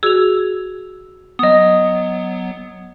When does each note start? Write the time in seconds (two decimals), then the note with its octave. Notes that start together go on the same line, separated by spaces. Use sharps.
0.03 F#4 G#4 E6 F7
1.39 F#3 B3 D#5 D#6